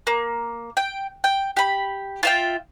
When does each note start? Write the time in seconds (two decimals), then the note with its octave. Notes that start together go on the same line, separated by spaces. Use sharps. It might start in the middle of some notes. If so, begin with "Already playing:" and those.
0.07 A#3
0.77 G5
1.24 G5
1.57 G4 B5
2.23 F4 E5 G5